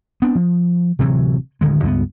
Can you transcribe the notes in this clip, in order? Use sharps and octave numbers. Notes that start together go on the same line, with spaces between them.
B3 C4 D4
F3
D1 C3 E3 F#3
D1 D3 D#3 G#3
C#2 G2 A#3 B3